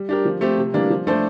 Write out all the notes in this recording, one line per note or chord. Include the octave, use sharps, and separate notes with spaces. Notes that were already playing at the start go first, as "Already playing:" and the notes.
Already playing: G3
D4 G4 A#4
F3
A3 C4 G4
C3
E3 G3 A#3 D4
F3
A3 D4 A4 C5